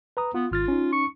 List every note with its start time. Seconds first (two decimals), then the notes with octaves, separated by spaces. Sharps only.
0.17 B4 A#5 D#6
0.34 B3 F4
0.52 G#1 F4 F6 A6
0.68 C#4 D#4
0.92 C#6